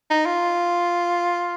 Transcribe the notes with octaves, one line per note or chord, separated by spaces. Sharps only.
D#4
F4